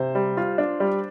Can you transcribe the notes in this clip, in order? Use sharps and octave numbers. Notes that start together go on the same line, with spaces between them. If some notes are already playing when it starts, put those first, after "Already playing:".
Already playing: C3 C5
G3
F4
D4
G3